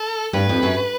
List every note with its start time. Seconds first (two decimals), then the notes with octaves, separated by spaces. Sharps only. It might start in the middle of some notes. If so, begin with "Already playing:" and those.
Already playing: A4
0.33 G2 B4
0.49 F2
0.63 F#2